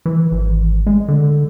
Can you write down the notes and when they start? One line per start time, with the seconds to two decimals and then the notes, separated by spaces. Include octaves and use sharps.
0.06 E3
0.32 G#1
0.87 G#3
1.08 D3